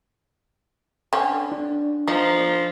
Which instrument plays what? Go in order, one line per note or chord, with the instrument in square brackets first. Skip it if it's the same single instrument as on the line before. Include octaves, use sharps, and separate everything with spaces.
[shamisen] D3 C#4 [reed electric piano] G5
[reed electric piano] D4
[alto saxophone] F3 [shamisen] D#4